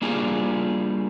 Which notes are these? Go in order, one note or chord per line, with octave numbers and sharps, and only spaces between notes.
G3 A#3 D4 F4 G#4